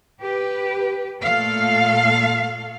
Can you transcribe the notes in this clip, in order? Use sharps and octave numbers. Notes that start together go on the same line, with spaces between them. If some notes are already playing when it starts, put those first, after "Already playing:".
G4 B4
A#2 A3 A4 F5